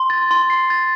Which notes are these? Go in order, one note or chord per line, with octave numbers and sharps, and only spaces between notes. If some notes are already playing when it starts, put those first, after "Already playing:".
Already playing: C6
A6
C6
C7
A6